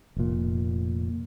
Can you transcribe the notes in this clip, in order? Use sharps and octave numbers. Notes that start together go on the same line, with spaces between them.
F1 A#2